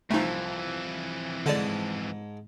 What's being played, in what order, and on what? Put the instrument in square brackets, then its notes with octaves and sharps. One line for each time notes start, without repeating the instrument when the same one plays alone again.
[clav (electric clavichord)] C2 F3 [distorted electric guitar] F2 E3 [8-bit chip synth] A3 D#4
[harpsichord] G#2 A5 D#6 [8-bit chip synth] D3 D5